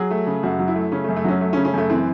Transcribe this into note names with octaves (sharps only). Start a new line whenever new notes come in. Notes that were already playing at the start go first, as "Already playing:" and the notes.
Already playing: F#3 G#4
A3
C#3
F#2 F#4
F#3
E4
A3
C#3 C#4
A3
F#2
A3
F#3 C#4
A3
C#4
C#3
C#4
F#2 A3
E3 C4